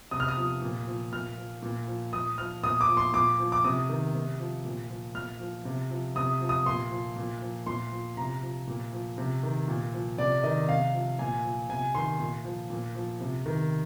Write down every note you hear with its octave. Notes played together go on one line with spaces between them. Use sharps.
C3 D#6
F6
D#6
F3
A#2
F3
A#2 F6
F3
A#2
F3
A#2 D#6
F3 F6
A#2 D#6
D6
F3
C6
A#2 D6
F3
D6
C3 D#6
D#3
C3
F3
A#2
F3
A#2 F6
F3
C3
F3
C3 D#6
F3
D#6
A#2 C6
F3
A#2
F3
A#2 C6
F3
C3 A#5
F3
A#2
F3
C3
D#3
A#2
F3
C3 D5
D#3 D#5
C3 F5
F3
A#2 G#5
F3
C3 G#5
D#3 C6
A#2
F3
A#2
F3
C3
D#3